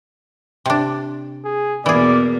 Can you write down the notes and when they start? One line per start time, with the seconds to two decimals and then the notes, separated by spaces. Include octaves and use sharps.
0.66 C3 D4
1.45 G#4
1.86 E2 B2 E3 A#3 G#4 D5